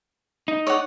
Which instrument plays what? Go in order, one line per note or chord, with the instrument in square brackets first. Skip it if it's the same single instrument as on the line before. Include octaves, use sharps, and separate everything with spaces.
[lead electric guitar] D#4
[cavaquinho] C#5 D5 F#5